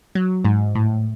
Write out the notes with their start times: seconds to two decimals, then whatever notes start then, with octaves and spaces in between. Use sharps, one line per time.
0.15 F#3
0.45 G#2
0.75 A2